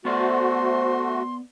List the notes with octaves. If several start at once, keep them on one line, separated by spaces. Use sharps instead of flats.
A3 B3 F#4 C5 D5 C6